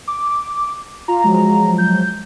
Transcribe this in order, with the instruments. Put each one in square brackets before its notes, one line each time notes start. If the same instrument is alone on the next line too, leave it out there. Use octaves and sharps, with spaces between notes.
[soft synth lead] D6
[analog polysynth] F4 [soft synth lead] A#5
[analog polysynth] F3 F#3 G#3
[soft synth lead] G6